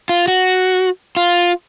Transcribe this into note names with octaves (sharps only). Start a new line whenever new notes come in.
F4
F#4
F4